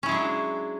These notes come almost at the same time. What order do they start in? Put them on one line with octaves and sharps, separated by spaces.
C#4 E4 G#3 F#3 D4